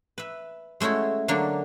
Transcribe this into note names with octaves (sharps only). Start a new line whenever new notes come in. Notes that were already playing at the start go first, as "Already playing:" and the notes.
B4 E5
G#3 A3 C#4 E4 F#4
D3 F#3 A#3 D4